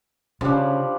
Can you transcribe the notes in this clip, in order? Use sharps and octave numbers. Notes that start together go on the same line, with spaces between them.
C#3 F3 G3 D4